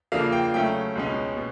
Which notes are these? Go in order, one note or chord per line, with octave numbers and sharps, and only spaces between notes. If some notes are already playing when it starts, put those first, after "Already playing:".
C#3 F3 A#3 D4 F5
G5
C#3 F#3 A3 C#4 G5
C#2 B2 G#3 C#4
B2